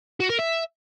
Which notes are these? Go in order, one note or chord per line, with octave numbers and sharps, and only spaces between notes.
F#4
A#4
E5